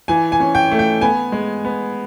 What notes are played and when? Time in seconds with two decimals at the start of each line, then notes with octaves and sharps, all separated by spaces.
0.08 E3 G#5
0.32 G#5
0.40 C#4
0.55 G5
0.71 A3
0.79 G5
1.01 B3 G#5
1.32 G#3
1.65 B3